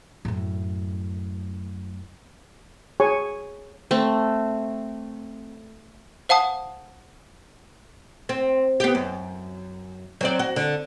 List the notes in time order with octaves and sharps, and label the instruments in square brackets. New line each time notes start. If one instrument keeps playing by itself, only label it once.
[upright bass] F#2 A2
[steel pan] G#4 C#5 G#5 C#6
[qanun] A3 C4
[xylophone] C5 F5 F#5 A5 D#6
[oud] C4
B3 G4
F#2
F#3 C4 D5
F#4
D3